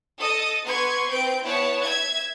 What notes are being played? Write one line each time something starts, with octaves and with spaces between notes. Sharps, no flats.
A4 D#5 D#6
B3 B4 C6 C#6 G#6
C4 B4 G6 D7
B3 E4 C#5 A5
E5 G#6